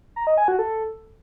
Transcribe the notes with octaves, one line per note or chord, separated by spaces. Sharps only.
A#5
D#5
G#5
F#4
A4